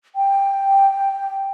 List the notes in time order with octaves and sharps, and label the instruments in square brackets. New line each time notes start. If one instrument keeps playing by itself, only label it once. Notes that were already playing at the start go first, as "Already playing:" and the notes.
[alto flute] G5